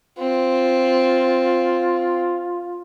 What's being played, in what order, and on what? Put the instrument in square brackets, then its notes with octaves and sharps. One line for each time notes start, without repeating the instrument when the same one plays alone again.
[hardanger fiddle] C4 [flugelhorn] F4